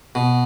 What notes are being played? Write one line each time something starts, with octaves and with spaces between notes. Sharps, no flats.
B2